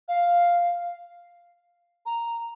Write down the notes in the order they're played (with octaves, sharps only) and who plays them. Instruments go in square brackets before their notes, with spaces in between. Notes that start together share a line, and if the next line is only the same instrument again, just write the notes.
[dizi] F5
A#5